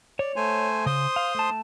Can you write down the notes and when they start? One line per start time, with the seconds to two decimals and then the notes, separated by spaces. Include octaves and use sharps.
0.19 C#5 D5
0.36 A3 C5 G#5
0.86 C#3 C5 C6 D#6
1.16 F5
1.35 A3 A5